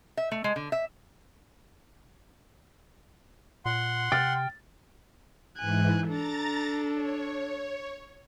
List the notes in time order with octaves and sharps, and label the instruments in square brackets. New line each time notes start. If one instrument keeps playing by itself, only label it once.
[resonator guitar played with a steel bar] E5
A3
G#3
D3
E5
[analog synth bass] A#2 [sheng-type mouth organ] F#5 C6
[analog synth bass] C3 [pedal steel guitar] G5 F6 [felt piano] A6
[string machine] G#2 E3 [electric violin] G#5 F#6
[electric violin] D4 A4 [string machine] A#5 A6
[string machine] C#5